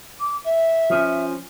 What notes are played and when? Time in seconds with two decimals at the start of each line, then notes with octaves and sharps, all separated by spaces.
0.20 D6
0.44 E5
0.90 F3 C#4